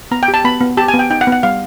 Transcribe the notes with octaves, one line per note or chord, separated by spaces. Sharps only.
B3 A#5
G5
G4
A5
B3 B5
B3
G4 A5
G#5
B3
G5
D#4 G5
F#5
B3
F#5
G3 F5